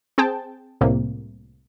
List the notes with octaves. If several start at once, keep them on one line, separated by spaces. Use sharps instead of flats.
C4 G#4 G5 A5
C2 A2 C3 A#3